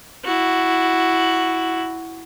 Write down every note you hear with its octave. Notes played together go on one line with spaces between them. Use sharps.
E4 F#4